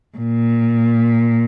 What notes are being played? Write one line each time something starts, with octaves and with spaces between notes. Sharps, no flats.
A#2